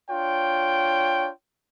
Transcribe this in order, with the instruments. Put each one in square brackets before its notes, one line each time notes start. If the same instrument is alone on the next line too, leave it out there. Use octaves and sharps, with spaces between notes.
[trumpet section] D4 F4 C#5 G5